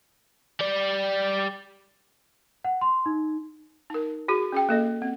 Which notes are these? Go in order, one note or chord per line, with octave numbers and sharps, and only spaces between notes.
G3 D5
F#5
C6
D#4
D#4 A#4
F#4 G#4
C#4 G#4 G5
A#3 A4 D#5
C4